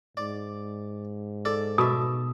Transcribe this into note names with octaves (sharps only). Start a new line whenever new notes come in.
G#2 D5
A4 D5
B2 E5 D#6